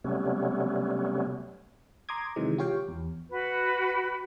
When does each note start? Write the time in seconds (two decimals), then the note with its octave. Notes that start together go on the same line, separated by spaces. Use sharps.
0.04 C3 F#3 G3 A3 B3 C#4
2.09 A#5 C6 D6 D#6 G#6
2.36 C3 D#3 E3 F#3 G#3
2.58 F4 G4 C#5 F5 G5
2.88 E2
3.30 F#4 B4